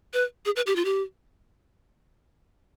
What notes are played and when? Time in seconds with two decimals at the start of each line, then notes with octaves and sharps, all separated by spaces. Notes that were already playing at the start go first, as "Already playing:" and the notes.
0.14 B4
0.45 G#4
0.56 B4
0.67 G4
0.76 F4
0.85 G4